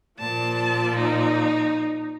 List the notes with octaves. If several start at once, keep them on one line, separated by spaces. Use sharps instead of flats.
A#2 F3 D5 A5
D#4